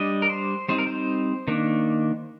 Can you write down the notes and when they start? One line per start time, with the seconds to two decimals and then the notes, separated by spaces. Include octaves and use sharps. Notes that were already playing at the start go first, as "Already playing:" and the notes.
Already playing: G3 D4 D#5
0.22 A#4
0.30 C5
0.68 G3 C4 D#4 C5
0.78 A#4
0.87 C5
1.48 D#3 A#3 D4